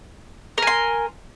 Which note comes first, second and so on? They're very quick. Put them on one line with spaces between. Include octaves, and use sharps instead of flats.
A#4 G#5 C6